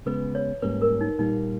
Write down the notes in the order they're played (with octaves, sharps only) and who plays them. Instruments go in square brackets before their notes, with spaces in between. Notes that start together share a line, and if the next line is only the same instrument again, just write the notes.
[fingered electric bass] C#3 G#3 B3 [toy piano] B4
[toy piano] C#5
[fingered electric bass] G#2 G3 A#3 C#4 [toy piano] B4
[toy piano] A#4
D#4
[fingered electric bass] A#2 G3 A#3 [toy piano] D#4